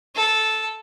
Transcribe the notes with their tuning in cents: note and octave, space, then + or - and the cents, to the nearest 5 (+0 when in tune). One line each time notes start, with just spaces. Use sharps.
A4 -10